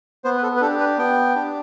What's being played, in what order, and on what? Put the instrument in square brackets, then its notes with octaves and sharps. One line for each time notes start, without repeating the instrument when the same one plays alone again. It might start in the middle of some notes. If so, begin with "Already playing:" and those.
[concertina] B3 C5
B4
A4
B4
D4 G4 A4
B4
B3 G5
D4 G4